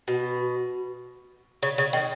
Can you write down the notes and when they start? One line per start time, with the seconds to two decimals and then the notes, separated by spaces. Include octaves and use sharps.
0.08 B2
1.63 C#3
1.78 C#3
1.93 D#3